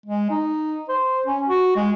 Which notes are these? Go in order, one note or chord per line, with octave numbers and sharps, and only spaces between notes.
G#3
D#4
C5
C#4
F#4
G#3